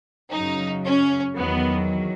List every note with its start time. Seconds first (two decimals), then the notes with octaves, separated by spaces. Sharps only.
0.31 F#2 C#3 F#3 D#4
0.84 C#4
1.36 E2 D#3 F#3 B3